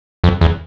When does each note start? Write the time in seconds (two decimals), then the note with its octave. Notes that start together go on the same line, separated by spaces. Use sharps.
0.24 F2
0.41 E2